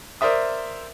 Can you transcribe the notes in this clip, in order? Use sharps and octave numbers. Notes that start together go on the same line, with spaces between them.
A#4 C5 D5 E5 D#6